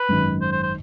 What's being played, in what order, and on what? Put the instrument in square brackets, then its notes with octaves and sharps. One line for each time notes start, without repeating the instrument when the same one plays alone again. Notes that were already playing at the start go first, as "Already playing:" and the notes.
Already playing: [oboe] B4
[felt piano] G#1 F#2 D#3
[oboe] C5
C5
C5